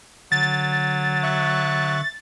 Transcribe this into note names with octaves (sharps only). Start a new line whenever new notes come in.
D3 F#3 A6
E5 C#6 F#6